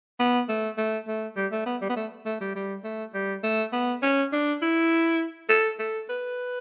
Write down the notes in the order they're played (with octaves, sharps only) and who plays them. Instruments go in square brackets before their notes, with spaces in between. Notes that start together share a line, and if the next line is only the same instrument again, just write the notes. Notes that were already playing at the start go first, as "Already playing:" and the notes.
[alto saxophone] B3
A3
A3
A3
G3
A3
B3
G3
B3
A3
A3
G3
G3
A3
G3
A3
B3
C#4
D4
E4
A4
A4
B4